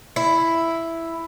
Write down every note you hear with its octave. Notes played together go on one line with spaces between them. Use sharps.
E4